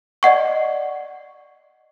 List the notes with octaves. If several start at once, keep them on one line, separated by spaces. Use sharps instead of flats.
D5 D#5 F#5 C#6